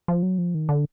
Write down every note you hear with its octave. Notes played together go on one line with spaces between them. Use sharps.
F3
F#3
F3
D#3
D3